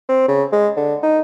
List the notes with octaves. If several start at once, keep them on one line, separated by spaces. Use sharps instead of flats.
C4
C#3
G#3
D3
D#4